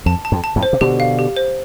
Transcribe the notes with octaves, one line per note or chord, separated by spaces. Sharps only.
F2 A5
A5
F2
A5
F2 A2
C5
C3
B2 D3 G4
F5
G4
C5